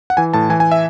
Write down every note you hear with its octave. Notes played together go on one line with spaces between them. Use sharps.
F#5
E3 G#5
A2 A5
E3 G#5
G#5
E5